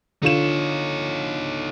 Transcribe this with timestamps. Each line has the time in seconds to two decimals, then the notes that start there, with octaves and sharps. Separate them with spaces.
0.23 D3 D#4 F4 C#5 E7